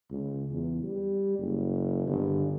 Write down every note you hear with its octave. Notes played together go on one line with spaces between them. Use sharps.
C#2
E2
G3
F#1
G1